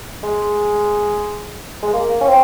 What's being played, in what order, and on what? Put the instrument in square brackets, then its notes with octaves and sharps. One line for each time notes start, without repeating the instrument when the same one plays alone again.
[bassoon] G#3
G#3
A#3
C#4
C4